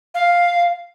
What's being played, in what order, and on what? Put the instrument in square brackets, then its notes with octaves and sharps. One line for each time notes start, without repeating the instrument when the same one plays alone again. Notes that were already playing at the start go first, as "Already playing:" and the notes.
[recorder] F5